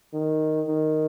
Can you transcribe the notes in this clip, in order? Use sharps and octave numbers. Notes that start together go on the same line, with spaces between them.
D#3
D#3